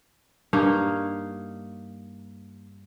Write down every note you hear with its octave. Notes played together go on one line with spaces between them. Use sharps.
G2 A#3 D#4 F5